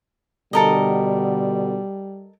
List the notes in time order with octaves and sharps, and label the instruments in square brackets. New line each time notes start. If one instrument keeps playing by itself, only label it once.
[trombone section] B2 D3 [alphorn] G3 [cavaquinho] A4 A#4 D#5